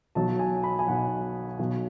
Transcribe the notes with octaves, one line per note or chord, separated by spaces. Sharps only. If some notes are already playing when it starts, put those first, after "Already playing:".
B1 B2 F#3 A5
G#5
B5
G#5
B1 B2 F#3 F#5
B1 B2 F#3